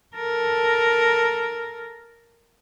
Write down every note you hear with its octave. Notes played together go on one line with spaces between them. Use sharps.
A4 A#4